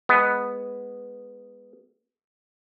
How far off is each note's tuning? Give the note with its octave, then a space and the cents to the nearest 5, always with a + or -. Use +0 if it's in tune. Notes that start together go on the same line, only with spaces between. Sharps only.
G#3 -10 B3 +0